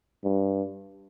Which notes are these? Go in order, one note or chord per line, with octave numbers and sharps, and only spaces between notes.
G2